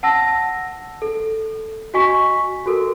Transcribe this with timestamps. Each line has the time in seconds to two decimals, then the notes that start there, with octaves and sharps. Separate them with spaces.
0.03 F#5 A5 E6 A#6
1.02 A4
1.94 F#4 D#5 G#5 C#6 B6
2.66 F#4 A4 A#4